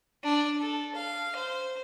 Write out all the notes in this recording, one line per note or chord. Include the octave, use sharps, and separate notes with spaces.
D4
A4
F5
C5